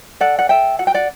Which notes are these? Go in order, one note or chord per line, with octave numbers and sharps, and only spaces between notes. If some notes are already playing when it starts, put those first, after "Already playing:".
A4 D5 F#5
F#5
A4 E5 G5
F#4 F#5
G5
D5 F#5